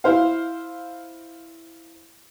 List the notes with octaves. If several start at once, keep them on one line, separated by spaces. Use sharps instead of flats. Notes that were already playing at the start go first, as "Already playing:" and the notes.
E4 C5 F5